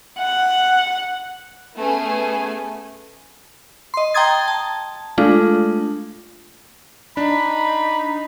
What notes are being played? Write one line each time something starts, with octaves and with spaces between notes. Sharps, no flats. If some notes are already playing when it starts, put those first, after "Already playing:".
F#5
A3 B3 C#4 G#4 G#5
D#5 C6
G5 A#5 C6 D#6 G#6 A6
A5
G#3 A3 D4 F4
D4 D#4 B5